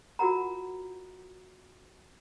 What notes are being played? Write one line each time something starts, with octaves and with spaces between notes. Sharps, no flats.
F4 F#4 A#4 F#5 A#5